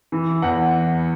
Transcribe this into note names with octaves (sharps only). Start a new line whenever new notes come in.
E3
E2 F#5